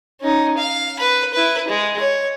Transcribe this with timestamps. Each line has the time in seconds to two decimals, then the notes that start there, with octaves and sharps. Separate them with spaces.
0.20 C#4 D#4
0.57 F5
0.99 B4 B5
1.33 E4 B4
1.68 G#3
1.99 C#5